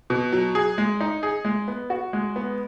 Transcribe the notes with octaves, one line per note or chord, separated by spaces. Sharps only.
B2
F#3
G#4
G#3
D#4
G#4
G#3
B3
F#4
G#3
B3